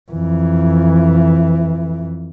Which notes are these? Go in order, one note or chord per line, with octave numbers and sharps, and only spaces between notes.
F2 E3